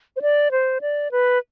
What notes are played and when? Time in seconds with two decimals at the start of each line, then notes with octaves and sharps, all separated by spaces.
0.16 C5
0.22 D5
0.51 C5
0.81 D5
1.12 B4